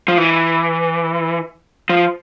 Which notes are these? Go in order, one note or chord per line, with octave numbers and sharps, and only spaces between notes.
F3
E3
F3